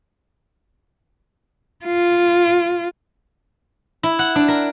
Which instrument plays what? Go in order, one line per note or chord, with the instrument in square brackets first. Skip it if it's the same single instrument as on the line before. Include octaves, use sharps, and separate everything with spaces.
[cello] F4
[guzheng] E4
F#5
D4
A#4